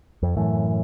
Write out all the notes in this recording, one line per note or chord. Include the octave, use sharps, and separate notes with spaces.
F2
F#2 A2 E3